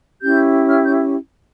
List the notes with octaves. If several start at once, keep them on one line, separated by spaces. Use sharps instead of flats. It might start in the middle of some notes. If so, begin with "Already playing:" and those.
C#4 E4 G4 G6
F6
G6